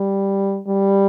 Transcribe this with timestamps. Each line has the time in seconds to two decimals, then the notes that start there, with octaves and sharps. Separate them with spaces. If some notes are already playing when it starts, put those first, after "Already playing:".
Already playing: G3
0.68 G3